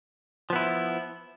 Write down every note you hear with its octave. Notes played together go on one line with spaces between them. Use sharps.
F3 B3 E4